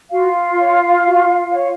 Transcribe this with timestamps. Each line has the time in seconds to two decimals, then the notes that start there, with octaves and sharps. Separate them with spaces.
0.11 F4 F#4 F5
0.58 C#5
1.06 F#4
1.53 C#5